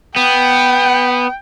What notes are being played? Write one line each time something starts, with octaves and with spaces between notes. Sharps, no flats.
B3 G5